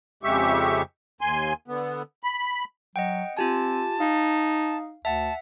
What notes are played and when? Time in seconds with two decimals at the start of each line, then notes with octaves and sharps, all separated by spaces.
0.23 F2 C#3 G#3 G4 E5 C#6
1.21 D#2 G#5 C6
1.68 D3 B3
2.23 B5
2.96 F#3 D#5 F#5 G5
3.37 C4 F4 G4 G#5 A5
4.00 D#4 F5
5.05 D2 E5 F#5 A5